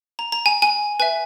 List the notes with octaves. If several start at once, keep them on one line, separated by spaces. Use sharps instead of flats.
A#5
A#5
G#5
G#5
B4 E5 G#5